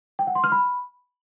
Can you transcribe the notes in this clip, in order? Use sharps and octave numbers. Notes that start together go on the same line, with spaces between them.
G5
F#5
C6
F6
B5